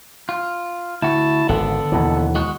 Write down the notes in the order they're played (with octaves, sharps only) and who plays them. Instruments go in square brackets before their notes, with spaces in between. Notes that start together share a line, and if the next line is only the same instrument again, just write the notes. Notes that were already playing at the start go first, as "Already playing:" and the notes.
[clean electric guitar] F4
[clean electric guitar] D2 F#4 [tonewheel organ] E4 A5
[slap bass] G#1 [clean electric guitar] D3 B3 [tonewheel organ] A4
[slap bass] D#2 B2 E3
[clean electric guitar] G#3 F#4